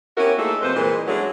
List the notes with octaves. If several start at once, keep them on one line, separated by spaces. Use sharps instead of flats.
B3 C#4 E4 F#4 G4 A#4
A3 A#3 D#4 F4 G#4 A4
F2 C3 B4 C5
A#2 E3 G3 G#3 G#4 A#4
F#3 G#3 A3 C#4 D4 E4